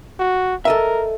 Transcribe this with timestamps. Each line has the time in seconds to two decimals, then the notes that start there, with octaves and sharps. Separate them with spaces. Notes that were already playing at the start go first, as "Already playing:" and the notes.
0.19 F#4
0.65 A4 A#4 D#5 E5